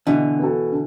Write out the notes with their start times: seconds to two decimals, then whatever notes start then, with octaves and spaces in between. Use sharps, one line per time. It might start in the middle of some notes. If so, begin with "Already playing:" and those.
0.07 B2 D3 E3
0.39 B3 F#4 A4
0.72 D3